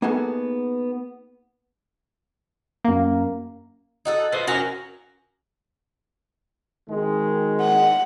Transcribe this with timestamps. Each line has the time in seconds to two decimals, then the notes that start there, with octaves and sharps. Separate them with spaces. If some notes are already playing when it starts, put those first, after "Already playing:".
0.02 A#3 B3 D#4 F#4 G#4 A4
2.85 F#2 A#3
4.05 D#4 F#4 A4
4.32 F4 B4 C5 D#5
4.47 C#4 F#4 A#4 G#5
6.88 G#1 D#3 G#3
7.61 F#5